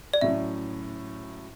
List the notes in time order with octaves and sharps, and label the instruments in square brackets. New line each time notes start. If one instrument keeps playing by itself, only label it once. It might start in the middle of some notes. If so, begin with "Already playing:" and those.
[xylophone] D5
[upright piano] A2 F#3 C#4 [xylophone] E5